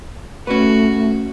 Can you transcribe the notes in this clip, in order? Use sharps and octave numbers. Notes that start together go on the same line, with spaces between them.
A3 C#4 F#4 B4